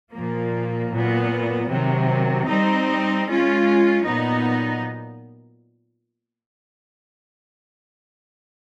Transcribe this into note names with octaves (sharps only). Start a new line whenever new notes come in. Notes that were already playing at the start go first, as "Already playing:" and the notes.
A#2 F3 A#3
A#2 F#3 B3
C3 D#3 F#3
G3 C4 D#4
G#3 C#4 F4
A#2 F#3 B3 D#4